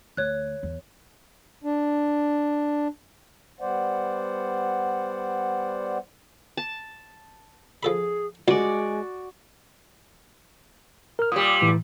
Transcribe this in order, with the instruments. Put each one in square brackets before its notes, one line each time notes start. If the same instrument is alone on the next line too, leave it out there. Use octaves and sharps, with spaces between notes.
[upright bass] D2 [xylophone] C#5 F#6
[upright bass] E2
[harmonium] D4
G3 B3 C5 D5 F#5
[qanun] A5
[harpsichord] F3 A4 B5 [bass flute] G#4
[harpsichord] C#2 G3 G4 [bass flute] G#3 [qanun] F#4 D5
[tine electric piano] A#4 F6
[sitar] A#2 G3 [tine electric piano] D#6
[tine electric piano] A2 E3